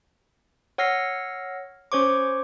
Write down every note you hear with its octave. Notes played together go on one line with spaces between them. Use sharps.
C#5 F#5 E6 F6 A#6 C7
C#4 C5 C#5 C#6 D6